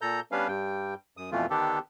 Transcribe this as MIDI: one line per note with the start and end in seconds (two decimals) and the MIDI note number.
0.01 0.20 46
0.01 0.20 69
0.01 0.20 82
0.01 0.20 91
0.32 0.47 55
0.32 0.47 59
0.32 0.47 61
0.32 0.47 62
0.32 0.47 71
0.32 0.47 77
0.48 0.94 43
0.48 0.94 55
0.48 0.94 79
1.17 1.30 42
1.17 1.30 87
1.32 1.46 41
1.32 1.46 47
1.32 1.46 52
1.32 1.46 57
1.32 1.46 65
1.50 1.79 50
1.50 1.79 51
1.50 1.79 59
1.50 1.79 62
1.50 1.79 67
1.50 1.79 69